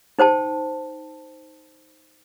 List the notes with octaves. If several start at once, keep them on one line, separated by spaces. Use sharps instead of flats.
D#4 C5 G5 A5